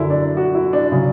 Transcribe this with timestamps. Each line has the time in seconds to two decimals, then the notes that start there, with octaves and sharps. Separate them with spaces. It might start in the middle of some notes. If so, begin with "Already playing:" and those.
Already playing: F#2 D3 F#3 E4
0.10 D4
0.37 F#4
0.55 E4
0.73 D4
0.92 C#3 F#3